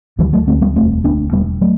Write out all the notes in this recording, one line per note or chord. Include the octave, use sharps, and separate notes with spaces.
D2 E3 G3
F#3 A3
D2 A3 C4
G3 B3
E1 A3 C4
D2 B3 D4
E1 G3 B3
F#3 A3